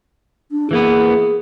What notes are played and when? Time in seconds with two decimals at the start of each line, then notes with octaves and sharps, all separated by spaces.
0.52 D4
0.71 E3 A#3 B3 G#4